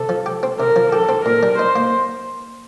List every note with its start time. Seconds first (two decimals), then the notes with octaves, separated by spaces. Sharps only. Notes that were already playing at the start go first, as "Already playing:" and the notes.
Already playing: C3 A4
0.09 F3
0.26 G4
0.43 C4
0.60 C3 A#4
0.76 F3
0.92 G4 A4
1.09 C4
1.25 A#2 A#4
1.43 G3
1.59 D#4 C5
1.76 A#3